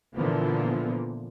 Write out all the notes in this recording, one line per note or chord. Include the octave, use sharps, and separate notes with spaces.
A#2 D3 E3 F3 A#3 B3